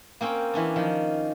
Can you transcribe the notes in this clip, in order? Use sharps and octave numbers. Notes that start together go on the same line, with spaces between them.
A#3 C4 C#4 G5
E3 C#4 D4
D#3 F3